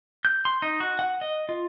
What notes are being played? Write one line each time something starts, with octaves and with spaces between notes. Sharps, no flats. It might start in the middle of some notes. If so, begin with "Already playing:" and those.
G6
C6
D#4
F#4
F#5
D#5
F4